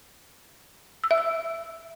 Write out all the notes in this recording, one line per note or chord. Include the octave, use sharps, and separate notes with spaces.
E6
E5
E6